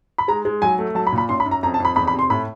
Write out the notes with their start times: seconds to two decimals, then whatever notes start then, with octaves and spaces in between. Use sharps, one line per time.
0.18 B5
0.28 G#3 A#5
0.45 G#3
0.62 F#3 G#5
0.79 A3
0.95 F#3 A5
1.07 B5
1.12 A#2
1.18 B5
1.29 F#2 C6
1.40 B5
1.46 F#2
1.51 A#5
1.63 F2 A#5
1.74 A5
1.80 F2 B5
1.96 E2 B5
2.07 B5
2.13 C3
2.19 C6
2.30 A2 B5